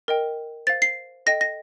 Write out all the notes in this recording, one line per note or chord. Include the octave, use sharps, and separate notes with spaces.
A#4 D#5 G5
C5 F5 A6
C7
A4 D#5 G5 A#6
A#6